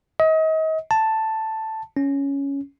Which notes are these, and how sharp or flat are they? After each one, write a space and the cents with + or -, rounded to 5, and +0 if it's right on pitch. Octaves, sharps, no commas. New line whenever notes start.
D#5 +35
A5 +5
C#4 +5